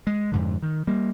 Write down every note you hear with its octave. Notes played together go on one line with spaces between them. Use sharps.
G#3
F2 G#2 D3
D#3
G3 A#3